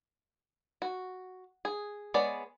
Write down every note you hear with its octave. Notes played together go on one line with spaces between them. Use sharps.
F#4
G#4
G#3 B3 C#5 D5